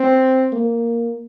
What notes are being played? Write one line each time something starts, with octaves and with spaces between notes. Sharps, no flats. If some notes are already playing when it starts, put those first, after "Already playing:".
Already playing: C4
A#3